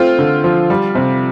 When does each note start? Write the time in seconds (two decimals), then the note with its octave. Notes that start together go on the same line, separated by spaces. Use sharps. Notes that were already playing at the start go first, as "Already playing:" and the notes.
Already playing: A3 C4 F4
0.19 D3
0.44 F3
0.70 G3
0.95 C3